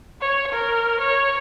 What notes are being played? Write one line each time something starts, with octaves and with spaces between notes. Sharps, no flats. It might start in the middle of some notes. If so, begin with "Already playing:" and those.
C#5
A#4
C#5